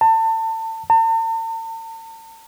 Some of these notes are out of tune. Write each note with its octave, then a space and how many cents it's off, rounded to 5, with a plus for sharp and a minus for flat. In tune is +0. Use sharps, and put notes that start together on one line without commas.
A5 +30
A5 +45